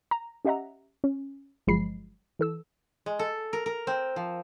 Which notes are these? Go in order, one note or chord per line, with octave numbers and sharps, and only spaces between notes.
A#5
C#4 G4 D#5 E5 F#5 A#5
C#4
G1 F3 F#3 G#3 B5 C7
E3 A4 E6
G#3
A4
A#4
A#4
C4
F3